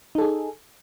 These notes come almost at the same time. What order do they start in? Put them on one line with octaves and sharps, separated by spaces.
D#4 A4 G#4